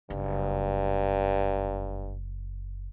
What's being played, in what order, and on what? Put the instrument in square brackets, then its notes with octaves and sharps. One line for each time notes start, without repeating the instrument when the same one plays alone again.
[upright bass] F#1 [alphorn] G2